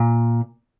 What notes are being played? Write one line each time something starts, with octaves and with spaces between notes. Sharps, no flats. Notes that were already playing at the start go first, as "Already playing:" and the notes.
Already playing: A#2